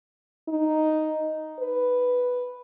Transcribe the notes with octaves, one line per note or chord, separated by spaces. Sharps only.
D#4
B4